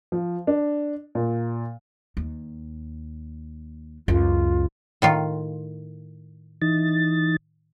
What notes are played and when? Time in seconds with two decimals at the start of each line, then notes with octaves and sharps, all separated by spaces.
0.12 F3
0.47 D4
1.15 A#2
2.17 D#2
4.08 C#2 F#2 F4
5.02 A2 D#3 F4
6.62 E3 D#4 A6